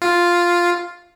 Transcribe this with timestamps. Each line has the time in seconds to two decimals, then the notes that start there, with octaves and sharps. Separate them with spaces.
0.02 F4